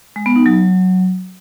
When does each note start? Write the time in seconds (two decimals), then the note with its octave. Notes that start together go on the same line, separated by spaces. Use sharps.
0.16 G#3
0.26 B3
0.36 D#4
0.46 F#3